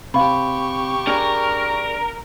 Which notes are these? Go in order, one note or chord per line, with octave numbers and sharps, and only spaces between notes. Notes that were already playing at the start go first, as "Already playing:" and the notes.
C3 G4 F5 B5 C#6
D4 G#4 A#4